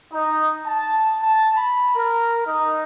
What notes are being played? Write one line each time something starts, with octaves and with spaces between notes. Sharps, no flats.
D#4
A5
A5
B5
A#4
D#4